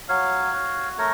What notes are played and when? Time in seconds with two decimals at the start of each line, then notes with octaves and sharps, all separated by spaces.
0.08 F#3 C#5 F5
0.53 F#4
0.98 A3 A#4 C#5